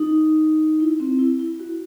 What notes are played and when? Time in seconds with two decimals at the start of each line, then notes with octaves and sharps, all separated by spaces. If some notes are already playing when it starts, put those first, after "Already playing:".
Already playing: D#4
0.80 E4
1.00 C4
1.19 E4
1.40 E4
1.60 F#4